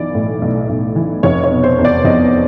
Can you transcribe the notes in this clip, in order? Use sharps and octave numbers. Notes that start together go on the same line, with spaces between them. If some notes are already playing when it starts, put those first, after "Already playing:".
Already playing: B1 E3 D5
A2
B1
B1
E3
F1 C#5
C#5
B2
C5
E2
D5
F1 D#5